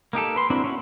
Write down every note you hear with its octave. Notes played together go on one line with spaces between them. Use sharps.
A#3 D#4 G4 A4
B4 C6
A#3 C4 D4 E4 F#4
C#4 E4 F#4